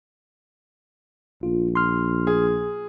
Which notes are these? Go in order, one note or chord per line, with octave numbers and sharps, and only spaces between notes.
A#1 F4
C6 F6
G#4